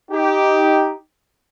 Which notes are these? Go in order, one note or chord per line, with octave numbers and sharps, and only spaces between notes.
D#4 G4